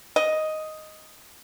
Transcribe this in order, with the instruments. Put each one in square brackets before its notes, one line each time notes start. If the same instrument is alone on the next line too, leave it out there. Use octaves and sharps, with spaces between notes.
[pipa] D#5